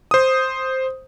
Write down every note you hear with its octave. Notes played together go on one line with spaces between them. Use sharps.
C5 D#6